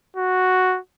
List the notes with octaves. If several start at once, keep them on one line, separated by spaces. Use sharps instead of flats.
F#4